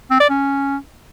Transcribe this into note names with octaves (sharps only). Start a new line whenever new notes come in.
C4
D5
C#4